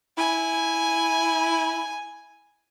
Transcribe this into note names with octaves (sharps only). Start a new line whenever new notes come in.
E4 G#5